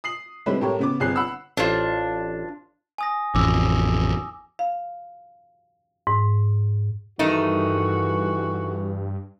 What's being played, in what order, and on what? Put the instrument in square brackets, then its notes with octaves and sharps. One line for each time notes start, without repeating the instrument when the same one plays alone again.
[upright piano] D#6 C7 F#7
D3 G3 G#3 C4 E4 B4
A2 G4 A#4 C#5
C#3 B3 D6
G1 C4 G#4 F#6 C7
F#5 B5 E6
[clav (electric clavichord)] A1 C5 [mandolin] D4 F4
[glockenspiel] G#5 D#6 A#6
[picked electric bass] A1 F2 [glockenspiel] D6 E6
[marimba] F5
G#2
[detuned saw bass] G2 [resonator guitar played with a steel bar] D#3 A3 D#4 [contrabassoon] E3 [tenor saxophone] F#4